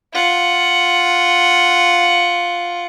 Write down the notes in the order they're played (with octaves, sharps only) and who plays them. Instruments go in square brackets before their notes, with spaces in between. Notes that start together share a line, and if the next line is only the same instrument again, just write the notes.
[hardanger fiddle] F4 F#5